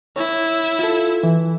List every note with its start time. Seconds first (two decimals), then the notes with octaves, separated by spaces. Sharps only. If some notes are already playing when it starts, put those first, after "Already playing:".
0.16 E4 C#5
0.79 F4 A4
1.23 E3